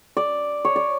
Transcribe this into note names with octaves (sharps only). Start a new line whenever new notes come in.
D5
C#5
D5